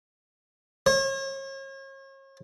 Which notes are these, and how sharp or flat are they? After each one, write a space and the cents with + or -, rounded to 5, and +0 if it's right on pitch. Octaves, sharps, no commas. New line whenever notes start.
C#5 -40